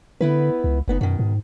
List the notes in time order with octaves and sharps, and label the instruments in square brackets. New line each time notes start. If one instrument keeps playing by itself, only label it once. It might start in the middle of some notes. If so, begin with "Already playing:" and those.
[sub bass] D3 [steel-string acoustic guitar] B3 E4 B4
[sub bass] C#2
[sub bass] F#1 [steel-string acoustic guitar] D2 B3 D#4
[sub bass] F#2 [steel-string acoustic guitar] B2 D#3
[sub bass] G#2